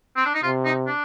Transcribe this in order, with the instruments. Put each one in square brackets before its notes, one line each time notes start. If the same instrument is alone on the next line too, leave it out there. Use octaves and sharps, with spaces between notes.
[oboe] C4
D4
D#4
[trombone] C3 [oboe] F4
[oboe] D#4
D4